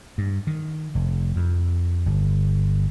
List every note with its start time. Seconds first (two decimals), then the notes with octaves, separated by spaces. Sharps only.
0.18 G2
0.47 D#3
0.95 F1
1.36 F2
2.06 G1